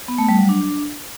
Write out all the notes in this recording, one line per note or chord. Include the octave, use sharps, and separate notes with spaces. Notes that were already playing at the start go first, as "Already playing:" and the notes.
B3
A3
G3
F#3
D4